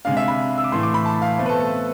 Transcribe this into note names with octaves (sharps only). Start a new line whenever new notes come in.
C3 G#3 D4 F5
E5
B5
E6
D6
A2 E3 A3 C6
D6
B5
A5
F5
B2 A3 C4
B4
A4
A4